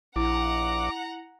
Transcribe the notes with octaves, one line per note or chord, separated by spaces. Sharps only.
A#1 E4 F#5 A#5 D6